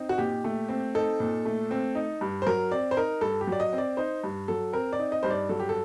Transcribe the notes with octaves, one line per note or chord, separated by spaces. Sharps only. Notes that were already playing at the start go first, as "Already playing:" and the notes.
Already playing: C4 D#4
F#4
A#2 G4
A3
C4
D#4 A4
A#2
A3
C4
D#4
G2
C5
F#3 A#4
C4 D5
C5
D#4 A#4
G2 A4
G4
F#3
D5
D#5
C4
D5
D#4 C5
G2
F#3 A4
C4 A#4
D5
D#4
D#5
G2 C5
D5
F#3 A4
G4
A4